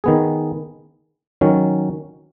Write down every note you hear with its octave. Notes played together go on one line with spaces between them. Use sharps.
D#3 B3 G#4
D#3 F#3 C#4